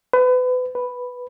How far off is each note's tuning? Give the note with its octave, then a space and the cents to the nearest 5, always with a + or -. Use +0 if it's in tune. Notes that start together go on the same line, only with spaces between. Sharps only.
B4 +30
B4 +0